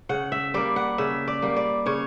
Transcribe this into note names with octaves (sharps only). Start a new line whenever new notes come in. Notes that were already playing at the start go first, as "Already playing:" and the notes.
C#3 F#5
E5
G3 A#3 D5
F#5
C#3 E5
D5
G3 A#3
D5
C#3 C#5